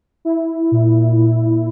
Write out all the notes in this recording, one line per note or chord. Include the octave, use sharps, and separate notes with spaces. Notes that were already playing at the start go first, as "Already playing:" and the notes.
E4
A#2
A#2